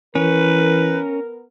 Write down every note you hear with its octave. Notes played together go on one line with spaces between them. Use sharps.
E3 B3 C#4 A#4 B4